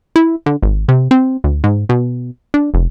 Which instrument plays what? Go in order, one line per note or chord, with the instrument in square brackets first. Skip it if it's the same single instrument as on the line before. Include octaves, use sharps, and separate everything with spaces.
[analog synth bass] E4
D3
G#1
C3
C4
D2
G#2
B2
D4
F1